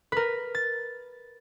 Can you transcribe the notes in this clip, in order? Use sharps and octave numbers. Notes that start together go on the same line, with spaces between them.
A#4 B4
A6